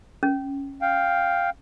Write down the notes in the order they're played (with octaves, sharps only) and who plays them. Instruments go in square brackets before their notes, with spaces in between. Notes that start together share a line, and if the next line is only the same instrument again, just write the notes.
[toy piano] C#4
[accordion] F5 G5